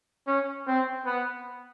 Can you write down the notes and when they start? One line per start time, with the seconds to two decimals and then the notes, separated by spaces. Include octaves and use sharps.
0.27 C#4
0.67 C4
1.06 B3